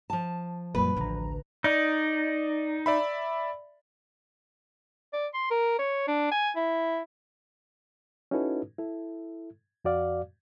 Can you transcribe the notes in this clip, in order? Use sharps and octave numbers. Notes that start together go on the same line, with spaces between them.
F3 A5
F#2 A#2 G3 A#3 B4
A1 D2 D3 A#5
D#4 D5
D5 E5 B5
D5
C6
A#4
C#5
D4
G#5
E4
C#4 D#4 E4 F#4 A4 B4
E4 A4
F2 F#4 D5 F5